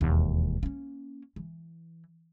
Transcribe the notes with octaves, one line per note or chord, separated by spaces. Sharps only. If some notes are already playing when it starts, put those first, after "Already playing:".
E1 D#2
A#3 C#4
E3